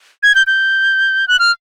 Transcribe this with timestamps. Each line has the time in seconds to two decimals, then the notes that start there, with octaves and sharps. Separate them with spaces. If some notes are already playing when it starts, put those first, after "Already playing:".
0.23 G#6
0.35 G6
0.47 G6
1.28 F#6
1.39 F6